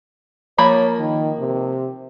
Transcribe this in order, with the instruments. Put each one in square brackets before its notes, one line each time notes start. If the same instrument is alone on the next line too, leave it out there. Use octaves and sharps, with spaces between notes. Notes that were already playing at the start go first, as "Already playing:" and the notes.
[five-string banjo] F3 A#3 B5 [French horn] C#5
[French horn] D#3
C3